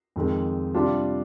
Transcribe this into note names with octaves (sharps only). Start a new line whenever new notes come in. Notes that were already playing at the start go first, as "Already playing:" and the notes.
F2 D#3 G#3
C3 G3 D4 F4